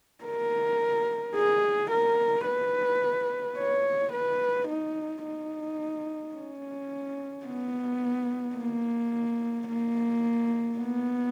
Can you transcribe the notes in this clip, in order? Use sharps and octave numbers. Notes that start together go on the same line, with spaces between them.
A#4
G#4
A#4
B4
C#5
B4
D#4
D#4
C#4
B3
A#3
A#3
B3